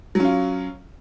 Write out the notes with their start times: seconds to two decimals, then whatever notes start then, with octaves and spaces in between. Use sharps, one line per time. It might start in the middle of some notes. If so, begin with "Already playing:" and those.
0.15 F#3
0.20 C#4
0.25 F4